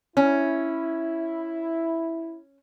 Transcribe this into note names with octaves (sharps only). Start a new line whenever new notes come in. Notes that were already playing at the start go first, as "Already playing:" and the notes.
C#4 E4